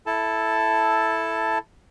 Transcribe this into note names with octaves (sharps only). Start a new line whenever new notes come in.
E4 A4 A5